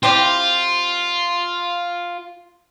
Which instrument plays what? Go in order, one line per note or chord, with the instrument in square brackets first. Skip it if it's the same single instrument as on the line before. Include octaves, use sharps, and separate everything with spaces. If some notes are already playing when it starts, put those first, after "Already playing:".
[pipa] C4 E4 G4 [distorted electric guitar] F4